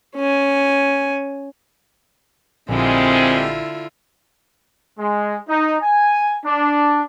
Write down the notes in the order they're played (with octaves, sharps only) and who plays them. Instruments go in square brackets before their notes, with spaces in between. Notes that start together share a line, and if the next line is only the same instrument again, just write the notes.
[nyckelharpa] C#4 G#5
[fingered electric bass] A#1 [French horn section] A#2 G3 G#3 [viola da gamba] D3 E4 F4 [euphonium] C4
[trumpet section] G#3
D#4
G#5
D4